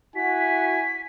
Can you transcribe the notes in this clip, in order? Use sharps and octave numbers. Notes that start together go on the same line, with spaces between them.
E4 F#4 F#5 G#5 B6